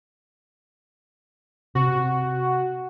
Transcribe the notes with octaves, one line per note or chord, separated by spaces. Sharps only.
C3 F#4